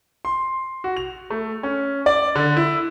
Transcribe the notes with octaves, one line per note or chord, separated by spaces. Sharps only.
C6
F#4
F7
A3
C#4
D5
D3
E4